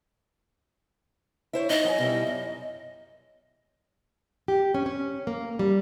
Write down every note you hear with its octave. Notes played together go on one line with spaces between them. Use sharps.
E4 C5 C#5
D#4 D#5
F#3 F#5 G#5
B2 G3 E4
F#2
G4
C#4
C#4
A#3
G3